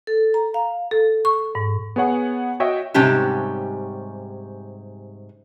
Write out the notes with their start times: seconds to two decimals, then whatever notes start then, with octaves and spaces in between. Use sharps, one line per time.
0.07 A4
0.34 A#5
0.54 F5
0.91 A4
1.25 C#6
1.55 G#2
1.96 B3 G#4 C#5 F#5
2.60 F#4 C#5 D#5 E5 G5
2.94 G#2 C3 G3 C#4 G4 A5